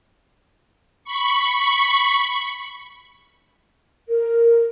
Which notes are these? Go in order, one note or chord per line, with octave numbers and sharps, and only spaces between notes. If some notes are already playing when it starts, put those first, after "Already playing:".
B5 C#6
A#4